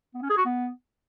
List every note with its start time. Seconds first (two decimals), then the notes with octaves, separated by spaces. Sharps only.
0.14 B3
0.22 C#4
0.30 G#4
0.37 F#4
0.45 B3